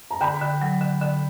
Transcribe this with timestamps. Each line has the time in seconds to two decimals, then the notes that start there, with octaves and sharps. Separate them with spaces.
0.11 A#5
0.21 D3 G5 B5
0.41 D3
0.62 F#3
0.81 D3
1.02 D3